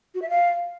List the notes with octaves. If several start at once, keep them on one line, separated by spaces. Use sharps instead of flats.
F#4
E5
F5